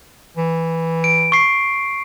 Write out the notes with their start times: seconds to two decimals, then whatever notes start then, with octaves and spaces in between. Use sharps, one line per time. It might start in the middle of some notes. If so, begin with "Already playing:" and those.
0.37 E3
1.04 D7
1.32 C#6 C7